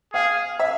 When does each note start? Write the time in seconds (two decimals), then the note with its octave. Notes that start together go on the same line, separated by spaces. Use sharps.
0.14 G#4 F5
0.59 E5